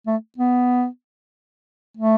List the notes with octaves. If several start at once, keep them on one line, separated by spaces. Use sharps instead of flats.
A3
B3
A3